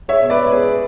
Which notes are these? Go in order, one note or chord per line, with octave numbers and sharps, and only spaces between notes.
G#3 C#5 E5
B2
B4 D5
B2
C#5
E2 G#4 B4